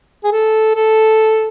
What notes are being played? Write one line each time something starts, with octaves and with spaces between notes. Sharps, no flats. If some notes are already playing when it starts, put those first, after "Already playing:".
G#4
A4
A4